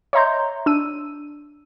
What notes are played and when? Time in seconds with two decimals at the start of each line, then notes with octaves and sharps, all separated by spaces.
0.13 C#5 D#5 E5 A#5 C6 G6
0.66 D4 E6 D#7